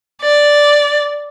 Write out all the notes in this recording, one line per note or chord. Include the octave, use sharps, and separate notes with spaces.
D5